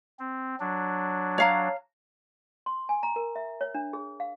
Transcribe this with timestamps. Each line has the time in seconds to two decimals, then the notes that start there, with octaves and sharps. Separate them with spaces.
0.19 C4
0.60 F#3 D4
1.38 C#5 F5 A#5
2.66 C6
2.89 G#5
3.03 A#5
3.16 A#4
3.36 E5
3.61 C#5
3.74 D4
3.93 G#4
4.20 F5